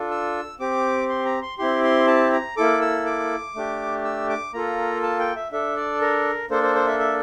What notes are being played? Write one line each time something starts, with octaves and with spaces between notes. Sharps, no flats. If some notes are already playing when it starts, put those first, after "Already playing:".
Already playing: D4 F4 A4
E6
C4 G4 D6
C6
A#5
C6
C4 E4 G4 C6
C6
A5
A#5
A#3 E4 A4 D6
E6
D6
A3 D4 G4
E6
D6
A#3 F4 A4 A#5
A5
G5
E5
D4 A4 E5
D5
A#4
A#3 D4 A4 C5
C5
C5
E5
E5